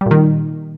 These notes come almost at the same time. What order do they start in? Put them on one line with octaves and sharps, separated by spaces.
G3 A#2 D#3